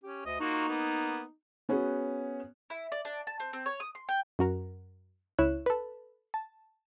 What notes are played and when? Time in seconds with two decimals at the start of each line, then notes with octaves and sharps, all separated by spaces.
0.04 C#4 G4
0.25 D2 D#5
0.40 A#3 D#4 F4 F#4
0.68 A#3 B3
1.69 B3 C#4 F#4 G#4 B4
2.70 E4
2.92 D5
3.05 D4
3.27 A5
3.40 C4
3.53 C4
3.66 C#5
3.80 D#6
3.95 C6
4.09 G5
4.39 F#2 F#4 A#4
5.38 C#2 E4 C#5 F#6 E7
5.66 A4 B4
6.34 A5